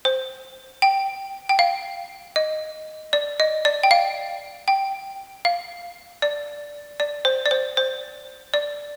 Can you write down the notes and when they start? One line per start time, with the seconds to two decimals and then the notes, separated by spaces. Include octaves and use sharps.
0.05 C5
0.82 G5
1.49 G5
1.59 F5
2.36 D#5
3.13 D5
3.40 D#5
3.65 D5
3.83 G5
3.91 F5
4.68 G5
5.45 F5
6.22 D5
7.00 D5
7.25 C5
7.46 D5
7.51 C5
7.77 C5
8.54 D5